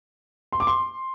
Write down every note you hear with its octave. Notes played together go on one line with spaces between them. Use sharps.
C6
D6
C6